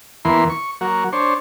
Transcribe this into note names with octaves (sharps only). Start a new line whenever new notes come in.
E2 E3 A#3 B3 C6
C#6
F#3 A#3 F#4
D4 C5 C#5